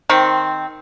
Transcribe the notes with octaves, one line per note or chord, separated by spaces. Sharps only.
D#3 C4